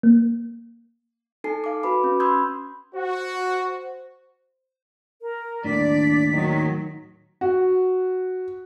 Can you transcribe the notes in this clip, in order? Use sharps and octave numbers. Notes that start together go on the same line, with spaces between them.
A#3
D#4 A4 G#5 A5 C7
F5 D6
F#4 B4 B5 D6
C#4
B5 C6 D#6 E6 G6 G#6
F#4 C5
A#4
D#2 A2 D4 D5 B6
D#3 F#3 D#4
F#4